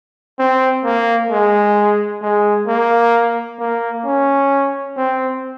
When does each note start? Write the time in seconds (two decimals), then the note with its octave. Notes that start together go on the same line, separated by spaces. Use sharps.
0.39 C4
0.84 A#3
1.30 G#3
2.22 G#3
2.67 A#3
3.59 A#3
4.04 C#4
4.97 C4